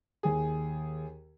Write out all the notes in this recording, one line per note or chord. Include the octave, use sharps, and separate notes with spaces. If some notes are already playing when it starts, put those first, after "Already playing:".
D#2 G#4